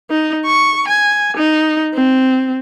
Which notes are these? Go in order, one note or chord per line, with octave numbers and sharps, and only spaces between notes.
D#4
C#6
G#5
D#4
C4